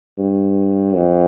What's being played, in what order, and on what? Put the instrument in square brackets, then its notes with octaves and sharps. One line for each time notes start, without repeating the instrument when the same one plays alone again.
[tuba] G2
F2